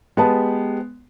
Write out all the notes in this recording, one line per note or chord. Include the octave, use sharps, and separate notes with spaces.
G#3 B3 G4 B4 A5